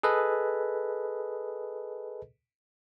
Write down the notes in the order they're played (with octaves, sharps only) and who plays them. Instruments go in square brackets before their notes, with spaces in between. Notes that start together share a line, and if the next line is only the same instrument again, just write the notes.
[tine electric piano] G#4 A4 B4 D#5